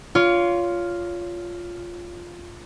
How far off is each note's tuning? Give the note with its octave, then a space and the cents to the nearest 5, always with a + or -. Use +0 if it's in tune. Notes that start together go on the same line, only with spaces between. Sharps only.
F4 +0 C#5 +30